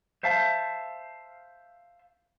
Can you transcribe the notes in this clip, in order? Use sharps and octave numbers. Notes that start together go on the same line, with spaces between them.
C5 E5 F5 A5